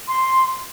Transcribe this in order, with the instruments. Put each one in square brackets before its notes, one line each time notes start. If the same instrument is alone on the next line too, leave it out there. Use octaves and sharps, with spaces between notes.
[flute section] C6